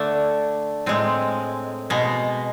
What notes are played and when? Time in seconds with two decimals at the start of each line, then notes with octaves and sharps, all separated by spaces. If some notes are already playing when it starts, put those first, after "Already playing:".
Already playing: D3 A3 D4
0.86 A2 G#3 C4
1.90 B2 G#3